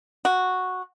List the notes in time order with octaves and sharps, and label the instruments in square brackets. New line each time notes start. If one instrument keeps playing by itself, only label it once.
[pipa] F#4